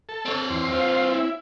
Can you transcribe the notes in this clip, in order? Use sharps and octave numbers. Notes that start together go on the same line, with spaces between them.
A4
C4 C#5
E2 C6
F4 C5
E4